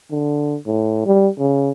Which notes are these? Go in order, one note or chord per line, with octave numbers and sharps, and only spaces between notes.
D3
A2
G3
C#3